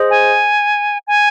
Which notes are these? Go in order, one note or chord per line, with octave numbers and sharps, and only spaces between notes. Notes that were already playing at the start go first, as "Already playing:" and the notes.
Already playing: G#4 C5 D#5
G#5
G#5